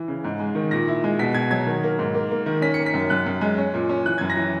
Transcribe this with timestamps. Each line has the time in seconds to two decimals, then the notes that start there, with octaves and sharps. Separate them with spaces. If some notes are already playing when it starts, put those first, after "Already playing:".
Already playing: E3
0.08 C#3
0.24 G#2
0.40 G#3
0.55 D#3
0.71 A#2 A#6
0.88 E4
1.04 G#3
1.19 B2 B6
1.34 B2 G#6
1.50 F#3 G#6
1.66 D#3
1.83 A#3
1.99 G#2
2.15 A#3
2.31 A#3
2.46 D#3
2.62 C#4 B6
2.74 C#7
2.79 A#3
2.86 B6
2.94 F#2
3.10 F#2 F#6
3.26 F#2
3.41 G#3
3.58 C#4
3.74 A#2
3.89 C#4
4.05 E3 F#6
4.18 G#6
4.21 F#2
4.30 A#6
4.37 E3